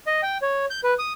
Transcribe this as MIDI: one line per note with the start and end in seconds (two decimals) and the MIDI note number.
0.07 0.21 75
0.23 0.38 79
0.42 0.65 73
0.70 0.80 91
0.84 0.94 71
0.99 1.13 87